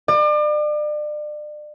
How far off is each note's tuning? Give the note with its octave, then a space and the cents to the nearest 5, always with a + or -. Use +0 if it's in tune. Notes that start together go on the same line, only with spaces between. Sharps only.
D5 +35